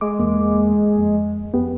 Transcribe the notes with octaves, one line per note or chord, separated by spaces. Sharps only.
G#3 D6
E2 A#3
F2
F2 B3 G4